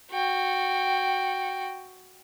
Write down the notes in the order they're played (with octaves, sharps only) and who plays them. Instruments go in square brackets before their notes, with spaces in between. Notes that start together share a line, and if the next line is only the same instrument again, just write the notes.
[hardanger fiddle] F#4 G5